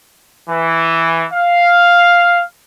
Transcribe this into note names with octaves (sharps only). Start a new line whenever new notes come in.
E3
F5